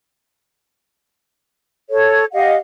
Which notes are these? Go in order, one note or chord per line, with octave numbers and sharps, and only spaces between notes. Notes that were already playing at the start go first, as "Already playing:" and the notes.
A4 C#5
G4 D#5 F5 F#5